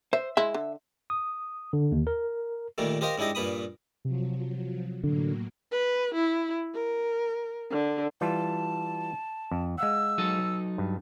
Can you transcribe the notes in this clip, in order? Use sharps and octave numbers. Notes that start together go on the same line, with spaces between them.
C5 E5
G#3 E4 E5
D3
D#6
D3
D#2
A#4
A#2 D#3 G3 A3
G4 A#4 C5 D#5 F5
G#2 D4 E4 G4 D#5
G2 A#2 B4 B5 D#6
C3 F3 F#3
A2 D3 F#3 A#3
B4
E4
A#4
D3
E3 G3 F4 A5
F2
G#3 F5 F#5 E6
F#3 D#4 A4
G2